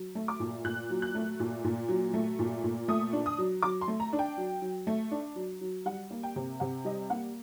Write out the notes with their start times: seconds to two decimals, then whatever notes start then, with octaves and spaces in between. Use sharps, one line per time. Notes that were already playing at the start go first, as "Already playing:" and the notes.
Already playing: F#3
0.15 A3
0.28 D6
0.40 A#2
0.64 A#2 F#6
0.90 F#3
1.02 F#6
1.15 A3
1.40 A#2
1.64 A#2
1.89 F#3
2.14 A3
2.39 A#2
2.64 A#2
2.88 A3 D#6
3.13 D4
3.26 D#6
3.38 F#3
3.62 F#3 D6
3.81 C6
3.88 A3
4.00 A#5
4.13 D4
4.19 G5
4.37 F#3
4.62 F#3
4.87 A3
5.11 D4
5.36 F#3
5.61 F#3
5.85 G3 F#5
6.10 A#3
6.23 G5
6.36 C3
6.60 C3 F#5
6.85 G3 D#5
7.10 A#3 F#5